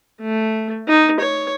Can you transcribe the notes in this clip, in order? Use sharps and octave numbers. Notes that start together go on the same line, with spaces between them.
A3
D#4
C#5